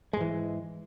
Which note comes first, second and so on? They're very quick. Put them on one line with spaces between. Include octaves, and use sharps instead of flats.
G#3 G#2 E3